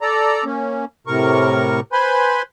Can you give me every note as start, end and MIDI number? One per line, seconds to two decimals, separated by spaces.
0.01 0.44 69
0.01 0.44 74
0.01 0.44 82
0.45 0.85 58
0.45 0.85 61
1.07 1.80 45
1.07 1.80 48
1.07 1.80 70
1.07 1.80 85
1.92 2.42 71
1.92 2.42 72
1.92 2.42 80
1.92 2.42 83
1.92 2.42 84